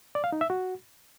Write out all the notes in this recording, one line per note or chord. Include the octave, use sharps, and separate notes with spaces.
D5
F5
D#4
E5
F#4